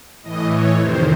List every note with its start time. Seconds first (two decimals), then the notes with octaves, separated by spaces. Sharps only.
0.23 A2 E3 D#5
0.51 C#5
0.80 F2 C3 D#3 C5